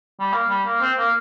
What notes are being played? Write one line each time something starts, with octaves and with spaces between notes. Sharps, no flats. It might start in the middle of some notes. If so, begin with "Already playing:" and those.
G3
A#3
G3
A#3
C4
A#3